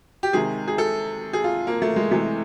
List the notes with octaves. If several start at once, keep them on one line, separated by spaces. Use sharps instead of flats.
G4
C3 D#3 G#3 G#4
G#4
A4
G#4
F4
A#3
A3
G#3
C3 E3 G#3 A3